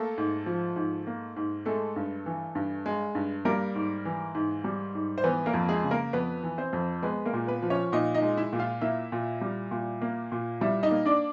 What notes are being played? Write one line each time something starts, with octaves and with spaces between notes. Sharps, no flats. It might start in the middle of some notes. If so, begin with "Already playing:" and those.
Already playing: A3 A#3 A4
G#2
F3
G#2
A#3
G#2
G#3 A3 A4
G2
E3
G2
G#3
G2
G3 A#3 A#4
G#2
E3
G#2
G3
G#2
C5
E3 B3 B4
A#3 A#4
F2
G#3 G#4
C#3
A#3 A#4
F2 B3 B4
E3
C4 C5
F2
G#3 B3 B4
A#3 A#4
A#2
B3 B4
F3
C#4 C#5
A#2 D#4 D#5
D#4 D#5
G#3
E4 E5
A#2
F4 F5
A#3 E4 E5
A#2
G3
A#2
A#3
A#2
G3 E4 E5
D#4 D#5
A#3
D4 D5